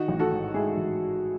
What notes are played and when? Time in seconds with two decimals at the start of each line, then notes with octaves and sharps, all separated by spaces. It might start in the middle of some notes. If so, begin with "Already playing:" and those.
Already playing: D#3 D#4 F#4
0.08 A1
0.19 F#4 A4
0.32 G#2
0.54 G#3 E4 G#4
0.77 A1